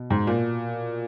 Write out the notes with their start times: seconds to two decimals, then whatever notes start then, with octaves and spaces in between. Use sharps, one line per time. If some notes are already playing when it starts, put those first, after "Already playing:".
Already playing: B2
0.10 G#2
0.27 A#2